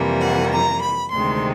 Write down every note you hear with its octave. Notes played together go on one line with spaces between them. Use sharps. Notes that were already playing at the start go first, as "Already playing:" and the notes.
Already playing: F2 C3 E3 G3 A#3
F#5
A#5
B5
D2 C3 D#3 G#3 C4 C6